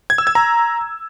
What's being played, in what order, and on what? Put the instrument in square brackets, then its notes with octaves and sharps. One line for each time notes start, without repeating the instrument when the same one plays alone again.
[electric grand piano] G#6
E6
G#6
A#5